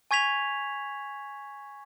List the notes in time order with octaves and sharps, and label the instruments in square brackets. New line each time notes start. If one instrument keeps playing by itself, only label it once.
[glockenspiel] G#5 C#6 G#6 B6 F7